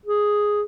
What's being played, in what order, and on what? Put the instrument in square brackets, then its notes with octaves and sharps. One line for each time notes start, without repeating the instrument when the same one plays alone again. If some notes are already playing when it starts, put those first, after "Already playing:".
[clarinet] G#4